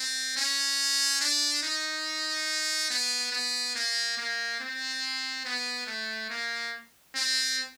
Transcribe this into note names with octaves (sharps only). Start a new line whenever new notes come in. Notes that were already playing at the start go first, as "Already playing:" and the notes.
Already playing: C4
C#4
D4
D#4
B3
B3
A#3
A#3
C4
B3
A3
A#3
C4